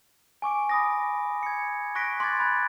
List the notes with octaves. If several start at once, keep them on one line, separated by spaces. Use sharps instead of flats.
G#5 C#6 D6 D7
B5 D#6 A#6
G#6 C#7
C#6 F#6 A#6 B6 D7
C6 D6 F#6 G#6 A6
B5 F#6 G#6